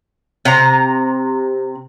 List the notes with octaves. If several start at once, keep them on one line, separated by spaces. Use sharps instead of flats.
C3 A#5